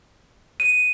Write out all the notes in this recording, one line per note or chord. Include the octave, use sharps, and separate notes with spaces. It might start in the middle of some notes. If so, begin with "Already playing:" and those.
D#7